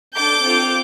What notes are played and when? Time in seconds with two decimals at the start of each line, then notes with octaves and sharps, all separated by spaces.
0.16 D4 A4 D6 G6
0.44 C4 F4 A4